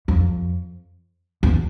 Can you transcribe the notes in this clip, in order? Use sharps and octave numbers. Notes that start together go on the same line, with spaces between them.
F2
E2